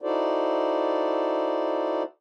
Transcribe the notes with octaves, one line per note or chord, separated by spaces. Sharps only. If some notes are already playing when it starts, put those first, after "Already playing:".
D#4 E4 F#4 A4 C5 D5